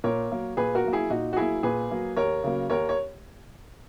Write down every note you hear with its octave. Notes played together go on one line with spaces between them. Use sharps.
A#2 A#4 C#5
F#3 A#3
A#2 G#4 B4
F#4 A#4
F#3 A#3
E4 G#4
A#2 D#4 F#4
F#4
F#3 A#3 E4 G#4
A#2 G#4 B4
F#3 A#3
D#2 A#4 C#5
C#3 F#3 A#3
D#2 A#4 C#5
C#5